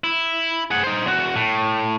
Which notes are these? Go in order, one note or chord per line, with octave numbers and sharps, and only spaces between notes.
E4
G#4 F#5
D#4 C5
E2 F#4
A2